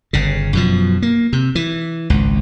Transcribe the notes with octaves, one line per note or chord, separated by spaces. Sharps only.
G1 C#3
F#2 B2 F3
A#3
C3
E3
G#1 C#2